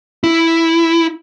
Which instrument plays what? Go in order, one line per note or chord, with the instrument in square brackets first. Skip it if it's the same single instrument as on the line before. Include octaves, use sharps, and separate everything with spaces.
[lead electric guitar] E4